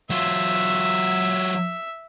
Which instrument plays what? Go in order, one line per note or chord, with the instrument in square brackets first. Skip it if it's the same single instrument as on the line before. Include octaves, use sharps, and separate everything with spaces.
[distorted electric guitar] F#3 F4 [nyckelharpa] E5